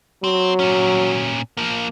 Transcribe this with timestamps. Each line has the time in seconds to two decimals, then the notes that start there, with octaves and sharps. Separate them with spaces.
0.24 F#3 C4
0.60 A#2 C#4
1.57 F3 A#3